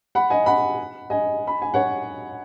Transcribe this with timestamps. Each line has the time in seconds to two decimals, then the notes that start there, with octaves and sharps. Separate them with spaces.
0.15 F#5 B5
0.30 D#5 G#5
0.46 F#5 B5
1.10 D#5 G#5
1.47 B5
1.62 G#5
1.74 C#5 F#5